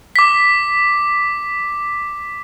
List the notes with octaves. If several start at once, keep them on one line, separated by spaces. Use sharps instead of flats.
D6 B6